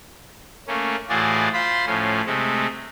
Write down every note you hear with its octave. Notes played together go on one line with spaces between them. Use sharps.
A3 A#3 C#4
A2 E3 F4 F#4 G#4 D5
F4 C5 B5 C6
A2 F3 C#4
C3 G#3 A3